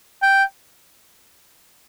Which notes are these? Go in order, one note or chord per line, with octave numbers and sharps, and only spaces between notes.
G5